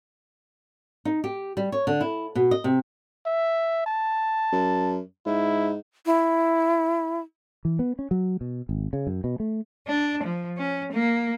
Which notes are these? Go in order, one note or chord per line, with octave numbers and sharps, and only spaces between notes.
D#4
G4
G3
C#5
D3
E4
B2
D#5
C3
E5
A5
F#2
G#2 E4
E4
E3
B3
C#4
F#3
B2
G#1
C#3
F#2
B2
A3
D4
F3
C#4
A#3